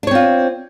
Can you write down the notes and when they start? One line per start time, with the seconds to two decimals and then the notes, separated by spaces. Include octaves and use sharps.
0.03 D4
0.07 C#5
0.11 C4
0.15 F4